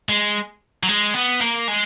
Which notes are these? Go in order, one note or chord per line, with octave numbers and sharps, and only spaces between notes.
G#3
F#3
G#3
B3
A#3
G#3